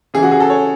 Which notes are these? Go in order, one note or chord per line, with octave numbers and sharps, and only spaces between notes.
C#3 E3 G#4
F#4
G#4
A4
C#5